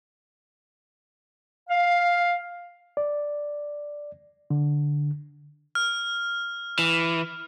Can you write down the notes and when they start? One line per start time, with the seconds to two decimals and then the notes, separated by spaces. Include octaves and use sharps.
1.69 F5
2.97 D5
4.50 D3
5.75 F6
6.79 E3